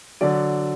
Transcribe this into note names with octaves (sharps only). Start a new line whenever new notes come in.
D3 F#3 D5